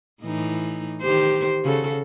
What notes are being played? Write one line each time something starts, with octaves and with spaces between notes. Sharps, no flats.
A2 E3 D#4
D#3 G4 C5
C#3 F#4 A4